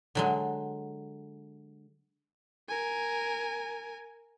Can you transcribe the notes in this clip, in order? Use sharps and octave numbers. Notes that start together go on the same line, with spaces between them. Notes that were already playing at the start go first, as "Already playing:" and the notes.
D3 F#3 G#3
A#4 G#5